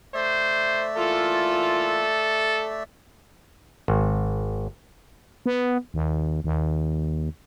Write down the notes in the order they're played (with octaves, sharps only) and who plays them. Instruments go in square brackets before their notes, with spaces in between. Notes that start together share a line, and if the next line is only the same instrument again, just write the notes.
[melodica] A3 D5 E5 [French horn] C5
[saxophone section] E3 A#3 F4 [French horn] A4
[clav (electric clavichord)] G#1
[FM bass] B3
D#2
D#2